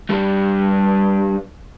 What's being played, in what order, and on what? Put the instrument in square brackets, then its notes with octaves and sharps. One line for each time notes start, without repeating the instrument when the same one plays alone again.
[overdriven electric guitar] G2 G3